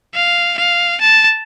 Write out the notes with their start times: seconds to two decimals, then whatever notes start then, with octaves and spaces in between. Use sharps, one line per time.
0.15 F5
0.58 F5
1.01 A5